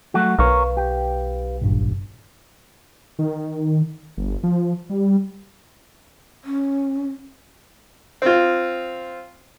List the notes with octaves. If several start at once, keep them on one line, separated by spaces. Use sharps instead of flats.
F#3 A3 F#4
B1 A#4 B4 C#5 F5
G4
G#1 G2 A#2
D#3
G1
F3
G3
C#4
C4 F4